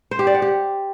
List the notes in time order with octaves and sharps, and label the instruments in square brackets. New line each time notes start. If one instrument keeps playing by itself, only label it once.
[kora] C5
G4
D5
F#5
G4